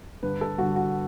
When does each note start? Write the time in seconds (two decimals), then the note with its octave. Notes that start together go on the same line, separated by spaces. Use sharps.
0.22 G2 D3 G3 B4
0.41 A4
0.58 G2 D3 G3 F#4
0.76 F#4